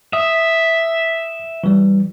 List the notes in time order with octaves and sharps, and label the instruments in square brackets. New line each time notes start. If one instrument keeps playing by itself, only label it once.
[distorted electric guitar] E5 [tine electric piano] D#6
[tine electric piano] E3 G3